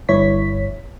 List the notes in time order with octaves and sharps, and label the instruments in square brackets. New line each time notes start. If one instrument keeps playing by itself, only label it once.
[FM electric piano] G1 G2 E4 C#5 B6